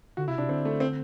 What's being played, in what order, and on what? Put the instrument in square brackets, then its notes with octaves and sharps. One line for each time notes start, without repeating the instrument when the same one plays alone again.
[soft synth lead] D3 [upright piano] F#4
[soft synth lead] C3 [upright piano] E4
[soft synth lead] C3 [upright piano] D4
[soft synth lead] D3 [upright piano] C4
[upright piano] A3
C4